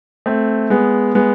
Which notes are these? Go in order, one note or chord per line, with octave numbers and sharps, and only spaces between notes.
A3 C4
G#3 B3
G#3 B3